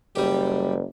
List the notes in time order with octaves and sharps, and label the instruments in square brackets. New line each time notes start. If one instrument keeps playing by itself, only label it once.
[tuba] F#1 [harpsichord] G3 G4